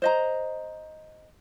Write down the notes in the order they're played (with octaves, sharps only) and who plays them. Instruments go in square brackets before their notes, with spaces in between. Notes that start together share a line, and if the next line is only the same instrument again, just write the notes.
[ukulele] C5 D#5 A#5